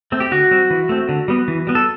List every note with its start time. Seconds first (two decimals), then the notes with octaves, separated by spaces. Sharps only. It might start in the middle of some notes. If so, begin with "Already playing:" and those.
0.12 A3 C4
0.20 G4
0.31 D3 F#4
0.51 G3 C4
0.70 E3
0.89 A3 C4
1.09 D3
1.28 G3 B3
1.48 E3
1.67 G3 B3
1.75 A4